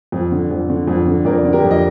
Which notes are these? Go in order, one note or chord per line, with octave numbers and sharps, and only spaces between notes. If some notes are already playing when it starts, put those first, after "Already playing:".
F2
D3
F2
D3
F2
D3
F2 A#4 D5
D3
G4 A#4
F2
D#5